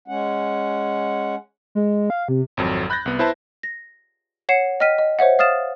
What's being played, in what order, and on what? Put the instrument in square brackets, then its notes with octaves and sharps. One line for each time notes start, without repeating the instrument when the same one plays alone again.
[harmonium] G#3 C#4 F#5
[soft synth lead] G#3
F5
C3
[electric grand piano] G#1 F2 F#3 A4
B5 F#6 G6 A6 A#6
C2 B3
E4 B4 C5 E5 A5
[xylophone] A#6
C#5 F#5 C7 C#7 E7
D#5 G5 F6 B6 D#7
D#5
C5 C#5 E5 F#5
F5 D#6 F6 A6 E7